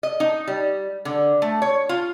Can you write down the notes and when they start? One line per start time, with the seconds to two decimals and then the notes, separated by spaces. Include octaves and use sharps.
0.03 D#5
0.20 D#4
0.47 G3
1.05 D3
1.42 A3
1.62 C#5
1.89 F4